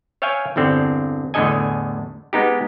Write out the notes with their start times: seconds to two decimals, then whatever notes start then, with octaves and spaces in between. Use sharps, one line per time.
0.22 C#5 E5 F5 G5 G#5
0.56 E2 G2 D3 C4
1.34 E2 A2 D3 A4 D#5 G#5
2.33 G#3 B3 D#4 G4